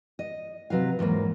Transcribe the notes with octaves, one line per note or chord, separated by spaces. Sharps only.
D#5
C3 F#3 B4 F5
E2 G#2 F#3 A#3